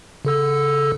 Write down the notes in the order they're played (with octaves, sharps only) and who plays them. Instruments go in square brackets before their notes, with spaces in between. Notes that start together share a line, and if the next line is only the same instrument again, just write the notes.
[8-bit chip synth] C#3 A4 E6